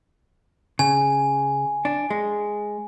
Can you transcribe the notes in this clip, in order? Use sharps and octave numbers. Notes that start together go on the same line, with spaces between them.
C#3 G#5
D4
G#3